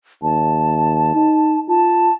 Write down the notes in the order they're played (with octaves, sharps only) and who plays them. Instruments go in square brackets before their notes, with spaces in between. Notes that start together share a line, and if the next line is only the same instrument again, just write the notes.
[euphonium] D#2 [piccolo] A5
[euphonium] D#4
[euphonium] F4 [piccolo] A5